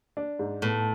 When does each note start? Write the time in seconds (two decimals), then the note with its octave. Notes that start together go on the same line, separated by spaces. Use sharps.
0.17 D4
0.39 G#2
0.62 A2 B3